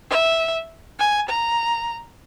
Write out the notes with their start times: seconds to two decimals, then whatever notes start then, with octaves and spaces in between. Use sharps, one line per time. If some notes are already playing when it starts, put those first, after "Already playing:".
0.10 E5
0.99 G#5
1.29 A#5